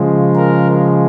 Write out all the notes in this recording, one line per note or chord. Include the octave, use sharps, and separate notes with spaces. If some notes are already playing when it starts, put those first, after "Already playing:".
Already playing: C#3 F3 G#3
A#4